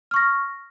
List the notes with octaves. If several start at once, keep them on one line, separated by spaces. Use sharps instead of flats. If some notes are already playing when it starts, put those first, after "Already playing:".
C#6 F6 A#6